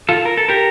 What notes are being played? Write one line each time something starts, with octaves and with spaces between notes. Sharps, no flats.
F4 A4
A#4
A4
G4 A#4